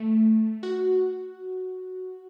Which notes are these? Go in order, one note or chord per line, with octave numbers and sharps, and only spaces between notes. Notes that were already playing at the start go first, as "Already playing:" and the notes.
Already playing: A3
F#4